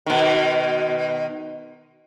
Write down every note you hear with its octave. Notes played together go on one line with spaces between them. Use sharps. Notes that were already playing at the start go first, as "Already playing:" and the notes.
B2 D#3